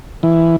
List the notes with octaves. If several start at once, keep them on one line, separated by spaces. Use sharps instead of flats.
E3